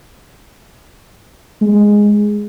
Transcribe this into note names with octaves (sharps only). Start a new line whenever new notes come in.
G#3